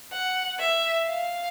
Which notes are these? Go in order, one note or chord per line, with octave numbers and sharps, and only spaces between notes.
F#5
E5
F5